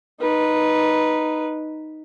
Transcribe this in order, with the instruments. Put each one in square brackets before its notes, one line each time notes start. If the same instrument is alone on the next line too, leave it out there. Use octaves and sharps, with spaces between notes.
[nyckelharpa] D#4 B4